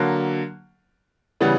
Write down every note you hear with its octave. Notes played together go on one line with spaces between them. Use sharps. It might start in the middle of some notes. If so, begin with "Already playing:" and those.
Already playing: D3 F#3 A#3
C#3 E3 G3 B3